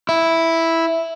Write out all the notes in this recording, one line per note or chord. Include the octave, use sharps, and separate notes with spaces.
E4